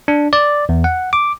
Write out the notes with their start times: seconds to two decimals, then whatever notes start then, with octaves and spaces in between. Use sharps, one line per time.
0.08 D4
0.33 D5
0.69 E2
0.84 F#5
1.13 D6